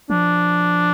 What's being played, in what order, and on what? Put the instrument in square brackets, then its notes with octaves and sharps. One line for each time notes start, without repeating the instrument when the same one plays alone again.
[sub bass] F3 [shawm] D4